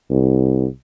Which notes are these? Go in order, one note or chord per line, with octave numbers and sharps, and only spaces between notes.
C2